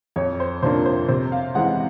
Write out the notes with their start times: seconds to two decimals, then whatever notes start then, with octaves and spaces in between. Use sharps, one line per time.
0.16 F2 C#5
0.40 C5
0.62 C3 F3 A#3 D4 C5
0.85 C5
1.08 C3 C5
1.32 F5
1.55 E3 G#3 C4 F#5